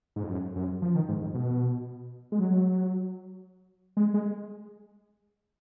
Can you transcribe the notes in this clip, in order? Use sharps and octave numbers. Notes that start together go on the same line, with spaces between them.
G#2
F2
F#2
F#2
F3
D#3
G#2
F2
B2
G#3
F#3
G#3
G#3